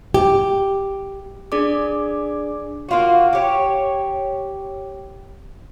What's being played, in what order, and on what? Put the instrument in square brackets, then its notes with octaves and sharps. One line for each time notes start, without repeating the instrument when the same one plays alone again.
[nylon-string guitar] G4
[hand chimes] D4 G#4 D5 D6
[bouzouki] A#3 F4 F#4
G4 C#5